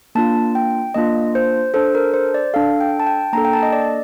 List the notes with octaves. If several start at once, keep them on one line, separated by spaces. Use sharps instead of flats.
A#3 D4 F4 A5
G5
A#3 D4 F4 D#5
C5
D4 A4 C5
A#4
C5
D5
D4 A4 F5
G5
A5
G5
A#3 D4 A4 A#5
G5
A5
D#5
D5